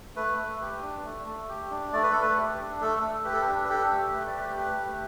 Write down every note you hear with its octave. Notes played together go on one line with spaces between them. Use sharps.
A3 B4
A3
G4
D4
A3
A3
G4
D4
A3 D5
B4
A3 A4
B4
G4
D4
A3 A4
A3
G4 B4
A4
B4
D4
B4
G4 A4
A3
A3 B4
D5
G4 B4
G4 B4
A3